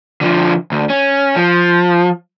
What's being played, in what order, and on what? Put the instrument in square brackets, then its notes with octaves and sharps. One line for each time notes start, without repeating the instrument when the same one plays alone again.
[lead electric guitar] D3 F3
D2
C#4
F3